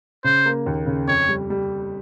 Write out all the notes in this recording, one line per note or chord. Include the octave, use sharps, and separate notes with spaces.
C#3 C5
A#3
D#2
C#3
F2 C#5
G3
G3